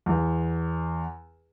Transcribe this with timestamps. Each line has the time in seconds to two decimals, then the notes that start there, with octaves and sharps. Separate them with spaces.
0.06 E2